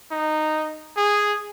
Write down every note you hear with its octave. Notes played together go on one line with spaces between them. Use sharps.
D#4
G#4